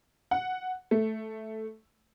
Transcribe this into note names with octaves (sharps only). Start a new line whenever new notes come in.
F#5
A3